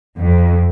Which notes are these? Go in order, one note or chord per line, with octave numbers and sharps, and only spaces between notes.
F2